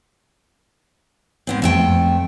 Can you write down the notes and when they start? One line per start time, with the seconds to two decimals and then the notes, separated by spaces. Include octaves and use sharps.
1.47 G#2 B3 C4
1.62 F2 A3 G5